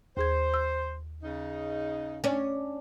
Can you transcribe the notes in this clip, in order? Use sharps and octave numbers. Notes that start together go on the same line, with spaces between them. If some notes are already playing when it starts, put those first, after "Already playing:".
D#2 G#4 C5 G#6
E6
C#3 D#4
C#4 D4